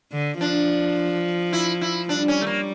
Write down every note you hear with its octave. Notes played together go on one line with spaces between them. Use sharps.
D3
F3 D4
E4
E4
G3 D4
C#4
A3
A#3